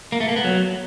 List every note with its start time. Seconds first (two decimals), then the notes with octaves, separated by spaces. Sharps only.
0.12 A#3
0.20 A3
0.28 A#3
0.36 B3
0.44 F#3